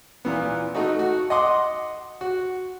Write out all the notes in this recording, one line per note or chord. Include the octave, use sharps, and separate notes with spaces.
A#2 E3 B3
A3 D#4 F#4
F#4
D#5 F#5 C6 D6 D#6
F#4